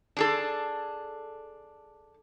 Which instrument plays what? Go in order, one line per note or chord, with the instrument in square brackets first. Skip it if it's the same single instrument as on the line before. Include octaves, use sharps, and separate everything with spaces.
[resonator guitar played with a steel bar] D4 G#4 A4